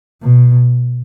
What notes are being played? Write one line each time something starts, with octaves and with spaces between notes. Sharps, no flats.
B2